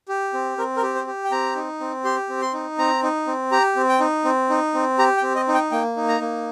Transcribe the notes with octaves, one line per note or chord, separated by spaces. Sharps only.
G4
C4
C4 A#4
A#4
G4
C5
G4
G5
C4 A#5
D#4
C4
G4 C6
C4
C6
D#4
C4 A#5
D#4
C4
G4 A#5
C4
G5
D#4
C4
D#4
C4
G4 A#5
G5
C4
D#5
D#4
G5
A#3 G5
D#4
A#5
A#3